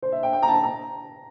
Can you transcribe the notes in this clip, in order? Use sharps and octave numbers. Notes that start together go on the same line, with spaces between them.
C5
E5
G5
G5
A#5
A5
A#5